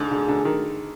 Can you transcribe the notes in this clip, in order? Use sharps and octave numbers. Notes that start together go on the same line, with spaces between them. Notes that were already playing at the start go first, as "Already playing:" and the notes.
Already playing: G#2 D3
D3
D3
D#3